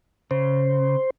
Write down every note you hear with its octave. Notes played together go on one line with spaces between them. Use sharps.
C#3 C5